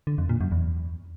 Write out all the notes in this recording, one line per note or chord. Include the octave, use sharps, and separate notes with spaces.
D3
F2
A#2
F#2
E2